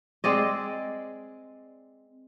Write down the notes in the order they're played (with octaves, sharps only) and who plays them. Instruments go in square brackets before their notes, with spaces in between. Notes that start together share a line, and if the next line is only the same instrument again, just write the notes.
[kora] G#3 C4 D5 D#5